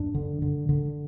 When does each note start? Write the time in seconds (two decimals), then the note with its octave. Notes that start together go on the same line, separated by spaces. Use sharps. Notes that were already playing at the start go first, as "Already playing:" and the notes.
Already playing: F#2 D4
0.14 D3
0.42 D3
0.69 D3